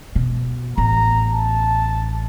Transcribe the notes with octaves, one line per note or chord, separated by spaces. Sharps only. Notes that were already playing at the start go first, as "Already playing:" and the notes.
B2
A1 B3 A#5
A5